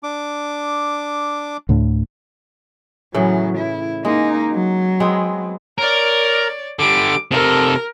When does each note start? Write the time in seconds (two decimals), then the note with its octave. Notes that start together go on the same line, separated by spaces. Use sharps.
0.03 D4 D6
1.69 D2 A2 D3
3.14 A2 C#3 E3 F#3
3.58 E4
4.05 G#3 A#3 D#4
4.53 F#3
5.00 G#3 B3 C4
5.78 A#4 C#5 D5
6.79 D3 G3 D6
7.31 C3 A4 A#4